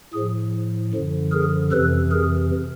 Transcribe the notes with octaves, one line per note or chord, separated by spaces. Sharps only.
A2 F3 G#4
F#2 D3 F3
G#4 A#4
F2 C3 E3 A4 B4
G#4 A#4